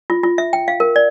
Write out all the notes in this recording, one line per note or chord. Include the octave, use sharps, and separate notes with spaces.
F4
F4
E5
G5
F5
A#4
D5